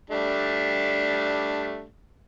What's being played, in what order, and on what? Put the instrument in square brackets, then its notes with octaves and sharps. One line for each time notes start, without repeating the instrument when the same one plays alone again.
[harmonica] G3 A3 D4